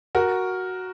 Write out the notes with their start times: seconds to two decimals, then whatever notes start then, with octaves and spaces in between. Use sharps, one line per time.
0.15 F#4 A#4